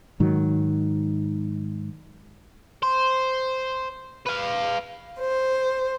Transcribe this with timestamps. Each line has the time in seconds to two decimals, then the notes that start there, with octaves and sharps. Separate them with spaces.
0.20 G#2 D#3 F#3
2.83 C5
4.27 B4 F5
5.19 C5